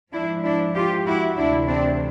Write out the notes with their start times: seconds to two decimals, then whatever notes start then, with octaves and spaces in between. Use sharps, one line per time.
0.13 G#2 F3 D4 E4
0.44 D4 E4
0.75 F4 G4
1.06 E4 F#4
1.37 D2 C3 E3 D4 E4
1.68 C4 D4